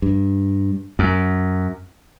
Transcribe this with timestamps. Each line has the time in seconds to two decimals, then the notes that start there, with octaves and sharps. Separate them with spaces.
0.02 G2
0.99 F#2